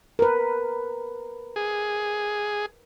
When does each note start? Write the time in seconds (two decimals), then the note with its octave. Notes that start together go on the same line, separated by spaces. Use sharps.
0.19 A#4 B4
1.56 G#4